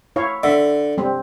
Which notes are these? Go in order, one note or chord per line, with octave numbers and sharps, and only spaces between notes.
E4 C#5 F5
D3 E5
G3 C4